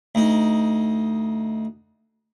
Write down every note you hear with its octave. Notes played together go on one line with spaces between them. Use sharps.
D2 D#4